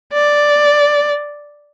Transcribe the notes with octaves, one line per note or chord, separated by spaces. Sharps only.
D5